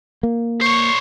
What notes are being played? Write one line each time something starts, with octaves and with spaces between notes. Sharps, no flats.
A#3
C5 C#5 C#6